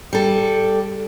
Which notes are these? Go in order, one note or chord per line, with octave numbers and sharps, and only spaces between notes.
G3 A4